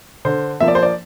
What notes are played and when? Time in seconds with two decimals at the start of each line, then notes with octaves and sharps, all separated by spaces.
0.25 D3 C5
0.60 F3 A#3 E5
0.68 D5
0.75 C5
0.83 D5